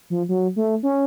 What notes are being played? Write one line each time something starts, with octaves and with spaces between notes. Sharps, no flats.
F3
F#3
A3
C#4